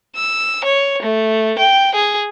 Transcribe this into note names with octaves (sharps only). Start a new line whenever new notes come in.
E6
C#5
A3
G5
G#4